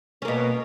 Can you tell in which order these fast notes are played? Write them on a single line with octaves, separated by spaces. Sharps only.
C#4 A#3 B2